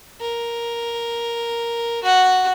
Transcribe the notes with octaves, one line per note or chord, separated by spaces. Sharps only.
A#4
F#4 F#5